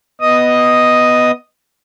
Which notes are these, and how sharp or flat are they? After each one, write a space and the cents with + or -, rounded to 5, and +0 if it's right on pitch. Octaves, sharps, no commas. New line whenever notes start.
B3 +0 D#5 +0 D#6 +0